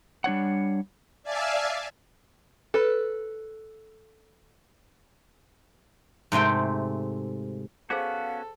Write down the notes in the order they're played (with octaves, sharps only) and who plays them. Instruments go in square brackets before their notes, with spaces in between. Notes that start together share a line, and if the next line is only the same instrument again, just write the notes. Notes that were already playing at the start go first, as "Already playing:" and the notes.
[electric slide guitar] G3 D4 C#5 F#5
[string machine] D5 E5 F5 G#5 A5
[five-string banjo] A4 B4
[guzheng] G#2 C3 A3 G5
[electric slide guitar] B3 C#4 F#4 [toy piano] G#4 C5 G5 [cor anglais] A4 [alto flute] F5